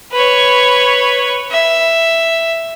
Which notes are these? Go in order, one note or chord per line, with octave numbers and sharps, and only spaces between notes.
B4 C#5
E5